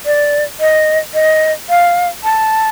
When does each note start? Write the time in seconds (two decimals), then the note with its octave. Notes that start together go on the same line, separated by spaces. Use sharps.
0.06 D5
0.60 D#5
1.14 D#5
1.69 F5
2.24 A5